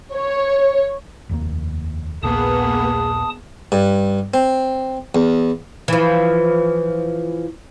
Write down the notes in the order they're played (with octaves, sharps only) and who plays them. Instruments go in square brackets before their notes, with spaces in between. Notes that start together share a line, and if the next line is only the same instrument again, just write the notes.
[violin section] C#5
[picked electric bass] F1 D#2 A#3
[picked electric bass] D#1 A#1 [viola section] A#3 B3 G#4 [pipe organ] A5 D#6
[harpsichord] G2
C4
E2
[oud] E3 F3